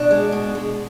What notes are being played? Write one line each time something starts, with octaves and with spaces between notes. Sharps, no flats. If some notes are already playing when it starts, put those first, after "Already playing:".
Already playing: B2 D4
G#3
B2
G#3